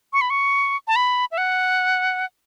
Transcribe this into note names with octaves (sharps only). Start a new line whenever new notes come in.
C#6
B5
C#6
A5
B5
E5
F#5